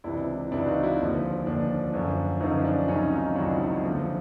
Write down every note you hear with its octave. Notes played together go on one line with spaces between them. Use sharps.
C#2 C3 E3 D4 E4
C#2 C3 E3 D4 E4
F#4
D#4 F4
E4 F#4
D#2 D3 F3
D#2 D3 F3 D4
F#2 D3 F3
F#2 D3 F3 C#4 D#4
D4
C#2 C3 D#3 F#3 C#4 D#4
D#4 F4
C#2 C3 D#3 F#3 D4 E4
D4 E4
D#2 D3 F3